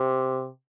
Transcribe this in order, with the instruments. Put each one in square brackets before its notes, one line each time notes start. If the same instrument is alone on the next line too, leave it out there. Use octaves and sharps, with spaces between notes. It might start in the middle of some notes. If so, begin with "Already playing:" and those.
Already playing: [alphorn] C3